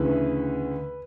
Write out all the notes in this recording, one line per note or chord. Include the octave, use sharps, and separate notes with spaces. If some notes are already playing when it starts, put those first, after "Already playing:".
Already playing: D2 C#3 E3 B4